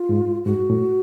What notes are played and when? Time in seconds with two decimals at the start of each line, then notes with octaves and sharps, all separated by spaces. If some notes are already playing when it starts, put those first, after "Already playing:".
Already playing: F4
0.09 G#2
0.45 G#2 F#4
0.70 A2